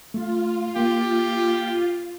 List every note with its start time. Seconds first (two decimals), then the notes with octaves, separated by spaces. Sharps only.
0.14 A3 F4
0.76 A#3 G4